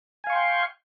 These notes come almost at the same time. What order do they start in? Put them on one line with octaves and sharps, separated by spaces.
G#5 F5 C#6 C6 G5